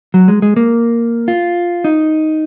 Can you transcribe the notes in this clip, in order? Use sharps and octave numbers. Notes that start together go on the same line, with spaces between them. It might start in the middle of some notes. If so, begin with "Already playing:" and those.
F#3
G#3
G#3
A#3
F4
D#4